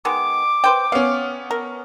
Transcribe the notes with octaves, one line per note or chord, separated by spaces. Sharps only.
D#3 G#3 B3 D6
B4 C5 G5
B3 C#4 F5
A#4